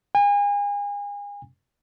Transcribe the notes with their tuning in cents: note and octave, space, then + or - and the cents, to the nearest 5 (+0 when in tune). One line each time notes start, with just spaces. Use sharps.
G#5 -35